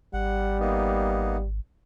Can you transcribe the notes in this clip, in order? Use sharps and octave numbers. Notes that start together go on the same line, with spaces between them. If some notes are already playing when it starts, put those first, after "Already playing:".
G#1 G3 F#5
A#3 B3 D#4